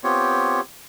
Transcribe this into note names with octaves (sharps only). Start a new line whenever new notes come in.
B3 C4 F4 G4 C#5